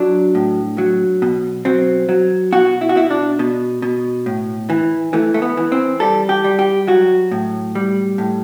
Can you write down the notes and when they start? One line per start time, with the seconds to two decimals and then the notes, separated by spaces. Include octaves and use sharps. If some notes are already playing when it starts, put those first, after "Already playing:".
Already playing: F#3 D4
0.35 A2
0.78 F#3
1.22 B2
1.65 F#3 C4
2.09 F#3
2.52 B2 F#4
2.81 E4
2.89 F#4
2.95 B2 E4
3.10 D4
3.39 B2
3.82 B2
4.26 A2
4.70 E3
5.13 E3 A3
5.34 A3
5.42 B3
5.57 E3
5.72 C4
6.00 G3 A4
6.29 G4
6.44 G3
6.59 G4
6.87 F#3 F#4
7.31 A2
7.75 G3
8.18 A2